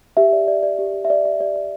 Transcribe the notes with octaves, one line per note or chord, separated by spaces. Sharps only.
G4 E5
D5
D5
D5
G4
G4
E5
D5
G4 E5
G4 D5
D5